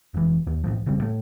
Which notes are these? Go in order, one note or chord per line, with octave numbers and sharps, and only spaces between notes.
F1 E3
D#2
A#1 A2 F3
F1 C#3 G3 C4
A2 A3